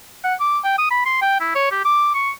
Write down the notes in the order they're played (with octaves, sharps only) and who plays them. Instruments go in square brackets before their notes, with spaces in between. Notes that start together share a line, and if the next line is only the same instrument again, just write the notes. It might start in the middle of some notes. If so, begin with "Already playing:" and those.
[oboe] F#5
D6
G5
D#6
B5
C6
G5
E4
C#5
G4
D6
C#6